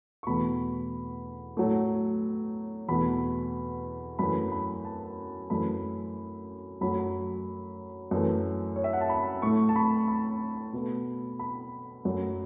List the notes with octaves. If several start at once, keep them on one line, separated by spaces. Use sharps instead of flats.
C#6
E2 B2 A3 B5
A2 F#3 A3
E2 B2 A3 B5
F#2 E3 A3 B5
B5
A5
F#2 E3 A3 B5
F#2 F#3 A3 B5
F#2 E3 A3
C#5
E5
F#5
A5
B5
A2 A3 C#6
A5
B5
B5
B2 A3
B5
F#2 F#3 A3